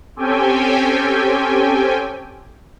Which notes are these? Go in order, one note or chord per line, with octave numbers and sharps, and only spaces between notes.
C4 C#4 G4 A4 G5 G#5